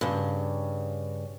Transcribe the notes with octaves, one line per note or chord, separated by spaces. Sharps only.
G2 C#3